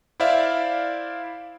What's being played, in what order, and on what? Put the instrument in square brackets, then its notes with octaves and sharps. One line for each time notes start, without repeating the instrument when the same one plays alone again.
[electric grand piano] E4 C5 D5 E5 F5